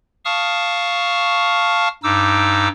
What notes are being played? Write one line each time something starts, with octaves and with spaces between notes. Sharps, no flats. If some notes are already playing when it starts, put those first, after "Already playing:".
F5 A5 C#6 D#6 F6
G2 D#4 D6 E6